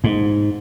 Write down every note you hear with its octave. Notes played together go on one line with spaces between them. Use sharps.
G#2